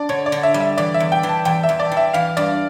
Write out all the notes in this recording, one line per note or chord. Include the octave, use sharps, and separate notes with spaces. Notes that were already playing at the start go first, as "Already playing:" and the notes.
Already playing: D4 D5
D3 C#5
D5
D3
E5
G3
E5
E3 D5
E5
E2
G5
E3
A5
E2 G5
E5
E2
D5
E3
E5
E3 F5
G2 D5